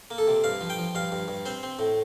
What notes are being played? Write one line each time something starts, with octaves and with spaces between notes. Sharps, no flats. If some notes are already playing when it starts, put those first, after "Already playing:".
A#3
A4
C3
G2 F5
F3
G5
F3
G2 F5
G2
G2
C4 C5
C4
A2